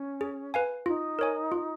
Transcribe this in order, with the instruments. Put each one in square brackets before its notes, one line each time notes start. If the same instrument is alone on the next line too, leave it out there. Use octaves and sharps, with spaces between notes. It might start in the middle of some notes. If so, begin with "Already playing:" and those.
Already playing: [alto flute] C#4
[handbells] G#4
B4 F5 G#5
[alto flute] D#4 [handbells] F4
[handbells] A#4 C#5 G#5
F4